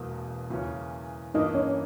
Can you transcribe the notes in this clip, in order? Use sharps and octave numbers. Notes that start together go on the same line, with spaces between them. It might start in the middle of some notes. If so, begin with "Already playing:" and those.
Already playing: E1 E2 B2 A#3
E2 C#3 E3 A#3 C#4
G2 E3 A#3 D#4 D#5
C#4 C#5